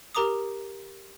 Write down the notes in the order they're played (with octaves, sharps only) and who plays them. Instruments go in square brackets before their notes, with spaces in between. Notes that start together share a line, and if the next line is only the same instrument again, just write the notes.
[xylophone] G4 A#4 A#5 D6 D#6